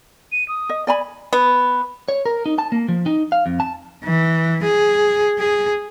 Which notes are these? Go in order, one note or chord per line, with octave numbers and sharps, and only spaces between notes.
D#7
D#6
D#5
D5 G#5 B5
B3
C#5
A#4
D#4
A5
A#3
F3
D#4
F5
F2
A5
E3
G#4
G#4